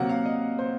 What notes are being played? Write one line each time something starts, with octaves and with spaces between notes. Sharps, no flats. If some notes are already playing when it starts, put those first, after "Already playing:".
Already playing: C3 F#3 A#3 F#5
F5
D#5
C5